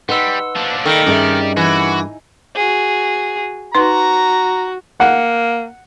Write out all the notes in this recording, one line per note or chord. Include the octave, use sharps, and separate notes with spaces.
G3 D#4 B4 F#5 C6 E6
F3 D4
D#3 G3 A#3 A4 G5 A#6
G2 C#4 G4 G#4 A#4 D5 E5
E3 F#4
F#4 G#4
D#4 F#4 B4 A#5 C6
A#3 F#5